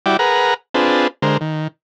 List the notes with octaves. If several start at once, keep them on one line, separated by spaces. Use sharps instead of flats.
G3 E4 F#4 D5 G5
G#4 A#4 B4 F#5 A#5
C4 D4 F4 G#4 B4 A5
D3 G#3 A#4 C5
D#3